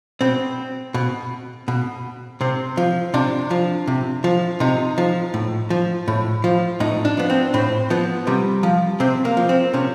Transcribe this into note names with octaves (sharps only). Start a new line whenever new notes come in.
B2 C4
B2
B2
C3 C4
F3
C3 D4
F3
C3
F3
C3 D#4
F3
A2
F3
A2
F3
A2 D#4
D4
F3 B3
C4
A2 C4
F3 B3
C3 G3
F3
C3 C4
A#3
F3
C4
C3 C#4